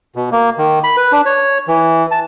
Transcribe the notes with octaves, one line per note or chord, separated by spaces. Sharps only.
B2
A#3
D#3
B5
B4
D4
C#5
E3
A5